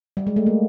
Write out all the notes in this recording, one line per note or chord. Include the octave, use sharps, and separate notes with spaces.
G3
G#3
A3
A#3